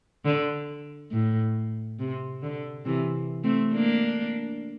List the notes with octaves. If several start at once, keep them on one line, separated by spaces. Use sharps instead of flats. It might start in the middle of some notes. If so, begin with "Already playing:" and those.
D3
A2
C3
D3
C3 E3
A3 C4
A#3 D4